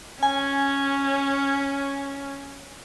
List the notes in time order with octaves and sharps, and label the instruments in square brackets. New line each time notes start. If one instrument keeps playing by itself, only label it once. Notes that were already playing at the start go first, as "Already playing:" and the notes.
[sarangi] C#4 [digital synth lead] G#5